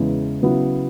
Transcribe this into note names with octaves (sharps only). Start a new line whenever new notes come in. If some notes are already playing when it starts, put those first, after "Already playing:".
Already playing: E2 C#3 E3 G#3
C#3 F#3 B3 E4